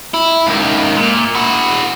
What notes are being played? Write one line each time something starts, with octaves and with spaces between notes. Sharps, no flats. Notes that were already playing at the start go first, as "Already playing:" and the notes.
E4
C#2 D#3
A#2
E4 F#4